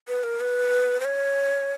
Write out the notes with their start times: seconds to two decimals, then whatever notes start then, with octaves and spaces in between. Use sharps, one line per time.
0.08 B4
0.23 A#4
0.40 B4
1.00 C5
1.05 C#5